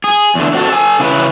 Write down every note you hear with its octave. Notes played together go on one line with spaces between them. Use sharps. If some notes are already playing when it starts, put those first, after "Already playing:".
G#4
E2 D3
C4 F#4 G#4 A4
A4 G#5
C#3 E3 B4